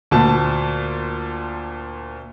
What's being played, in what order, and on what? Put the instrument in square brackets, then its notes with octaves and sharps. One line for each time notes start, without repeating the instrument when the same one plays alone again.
[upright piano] D2 A#2 A5